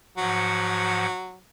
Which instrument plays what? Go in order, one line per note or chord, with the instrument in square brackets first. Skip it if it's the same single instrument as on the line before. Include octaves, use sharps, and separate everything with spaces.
[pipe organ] G#2 F3 F#5 [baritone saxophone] F#3